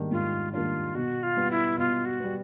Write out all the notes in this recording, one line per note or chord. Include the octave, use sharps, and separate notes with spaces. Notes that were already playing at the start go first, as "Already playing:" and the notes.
Already playing: G#2 D#3 G3 A#3 D4
G#2 F4
D#3 G3 A#3 D4 F4
B2 F#4
F4
G3 B3
E4
B2 F4
F#4
G3 B3